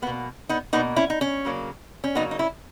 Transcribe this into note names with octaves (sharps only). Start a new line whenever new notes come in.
B2 A#3 B3
B3 D#4
B2 A#3 B3 D#4
C#4 E4
D#4
C#4
C#3 F#3 A#3
C#4
C#3 F#3 A#3 B3 D#4
D#4
C#4 E4